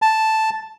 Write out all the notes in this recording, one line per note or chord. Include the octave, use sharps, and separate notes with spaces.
A5